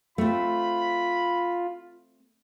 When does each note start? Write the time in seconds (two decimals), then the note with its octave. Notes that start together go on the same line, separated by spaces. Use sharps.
0.18 A3 C4 F4 B5